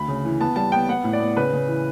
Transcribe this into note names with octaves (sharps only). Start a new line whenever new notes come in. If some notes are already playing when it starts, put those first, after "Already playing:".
Already playing: D2 B5
C#3
E3
B3 A5
G3 A5
B3 G5
B3 F#5
A2
D5
B3
C#3 B4
C#3
E3